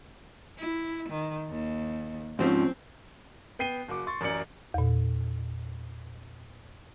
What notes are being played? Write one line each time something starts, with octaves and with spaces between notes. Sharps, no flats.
E4
D#3
D#2
G#2 F3 C4 C#4
B3 G5 C7 D#7 G7
F#1 F#4 D6
C6 C#6 A6
A1 F#2 A#4 D5 C#7 F#7
E2 A#2